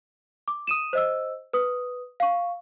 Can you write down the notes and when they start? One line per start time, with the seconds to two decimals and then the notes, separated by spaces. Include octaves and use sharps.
0.48 D6
0.67 D#6 D#7 E7
0.93 C5 D#5 E6
1.53 B4 D#6
2.20 F5 C#6